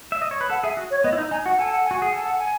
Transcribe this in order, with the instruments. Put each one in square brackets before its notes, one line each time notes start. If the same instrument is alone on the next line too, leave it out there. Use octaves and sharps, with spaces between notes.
[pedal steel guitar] E5
D#5
C#5
B4
[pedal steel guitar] A4 [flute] F#5
[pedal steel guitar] G#4 [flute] E5
[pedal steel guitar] F#4
[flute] C#5
[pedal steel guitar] B3 [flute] D#5
[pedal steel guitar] E4
D#4
[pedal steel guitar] D#4 [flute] G#5
[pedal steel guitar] F#4 [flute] F#5
[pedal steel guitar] A4 [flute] G#5
[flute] F#5
G#5
[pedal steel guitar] F#4
[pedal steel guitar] G#4 [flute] F#5
[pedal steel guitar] A4 [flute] G#5
[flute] F#5
G#5